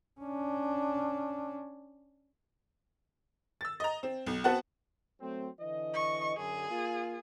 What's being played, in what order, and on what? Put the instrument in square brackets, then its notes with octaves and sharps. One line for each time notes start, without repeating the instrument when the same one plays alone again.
[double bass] C#4 D4
[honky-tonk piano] E6 A6
D#5 A#5
C4
B1
B3 C4 F#4 F#5 A5
[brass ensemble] F#3 A3 C4
D3 E3 D#5
[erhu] C#6
[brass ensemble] F#2 D3 [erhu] G#4
[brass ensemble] A#3 F4